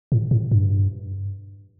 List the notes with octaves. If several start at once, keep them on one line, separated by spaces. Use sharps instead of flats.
A2
A2
G2